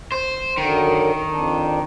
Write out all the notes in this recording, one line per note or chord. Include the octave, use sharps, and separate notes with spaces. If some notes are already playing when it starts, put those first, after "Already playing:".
C5
F#2 D3 D#3
F2 D4